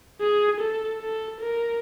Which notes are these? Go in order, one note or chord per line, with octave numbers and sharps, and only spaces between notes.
G#4
A4
A4
A#4